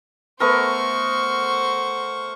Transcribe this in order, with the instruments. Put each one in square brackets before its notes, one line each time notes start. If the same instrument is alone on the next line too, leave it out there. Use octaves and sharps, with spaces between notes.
[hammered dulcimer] A3 B3 A#4 [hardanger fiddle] C5 C#6